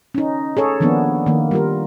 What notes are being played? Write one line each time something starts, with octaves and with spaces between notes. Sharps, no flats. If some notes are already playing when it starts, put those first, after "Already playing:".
C#4 D#4
G#4 A4 C#5
D#3 F3 A#3 B3 D4
D#3 A#3
G3 F4 A#4